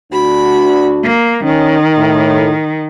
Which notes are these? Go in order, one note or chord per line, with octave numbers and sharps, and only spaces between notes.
D2 D4 F#4 B5
A#3
D#3 C#4
A2